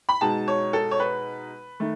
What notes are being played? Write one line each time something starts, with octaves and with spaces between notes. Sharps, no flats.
B5
B2 G#3 D#4 A5
C#5
A4
C#5
B4
D#3 A3